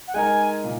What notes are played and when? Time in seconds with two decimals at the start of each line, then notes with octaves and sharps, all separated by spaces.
0.08 F#5
0.14 G#3 D#4 A#4 G#5
0.64 A#2